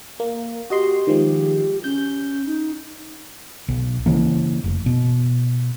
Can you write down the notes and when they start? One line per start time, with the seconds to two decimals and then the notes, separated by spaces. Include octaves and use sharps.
0.20 A#3
0.70 F#4 G4 D#5 C6
1.07 D#3 F3 G#3
1.84 C#4 G6
2.46 D#4
3.68 B1
4.06 C#3 E3 A#3
4.64 F1
4.86 B2